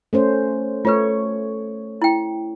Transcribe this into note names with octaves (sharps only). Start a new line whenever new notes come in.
A3 C#4 C5
A3 F4 B4 C#5
E4 G5